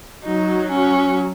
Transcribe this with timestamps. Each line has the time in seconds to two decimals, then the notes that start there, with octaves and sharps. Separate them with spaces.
0.24 F#3 D#4
0.70 C#4